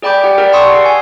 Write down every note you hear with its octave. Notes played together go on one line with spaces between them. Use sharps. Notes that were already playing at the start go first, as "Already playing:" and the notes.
G#4 D5 G5 B5 D6 G6
G4 F#5 G5
G#4 A#4 D5 F#5
F#5 A5 C6 C#6 D#6 E6
G#4 C7
G#5